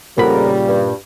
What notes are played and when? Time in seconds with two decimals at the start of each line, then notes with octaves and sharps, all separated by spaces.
0.18 F2 A#2 C#3 G3 B3 A#4 B5
0.68 G2